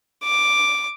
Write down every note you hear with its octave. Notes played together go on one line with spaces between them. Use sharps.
D6